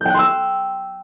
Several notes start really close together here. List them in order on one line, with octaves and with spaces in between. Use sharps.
G6 G5 F#6 C6 E6